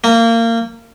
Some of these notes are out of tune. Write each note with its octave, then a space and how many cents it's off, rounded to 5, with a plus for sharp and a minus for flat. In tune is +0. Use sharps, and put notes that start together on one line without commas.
A#3 -25